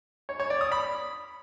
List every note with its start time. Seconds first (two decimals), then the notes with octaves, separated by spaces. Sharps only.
0.29 C#5
0.40 C#5
0.50 D5
0.61 D#6
0.72 B5